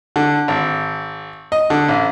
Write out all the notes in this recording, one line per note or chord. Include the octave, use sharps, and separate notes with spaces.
D3
G#1
D#5
D3
A1